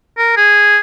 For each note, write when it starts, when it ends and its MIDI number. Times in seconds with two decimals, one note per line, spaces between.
0.18 0.36 70
0.37 0.79 68